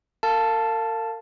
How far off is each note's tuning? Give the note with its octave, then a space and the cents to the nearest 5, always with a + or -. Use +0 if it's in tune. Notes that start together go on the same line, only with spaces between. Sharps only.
A#4 -45 F5 +0 A5 +0